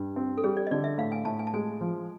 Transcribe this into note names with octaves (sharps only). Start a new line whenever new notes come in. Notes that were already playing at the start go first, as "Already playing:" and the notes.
Already playing: G2
C4
A4
G3 G#4
D5
D#5
D3 D5
E5
A2 F5
G#5
A2 A5
G#5
A5
G#3 G#5
F3